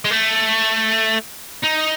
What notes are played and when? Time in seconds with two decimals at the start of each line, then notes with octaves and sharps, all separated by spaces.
0.05 G#3
0.11 A3
1.63 D#4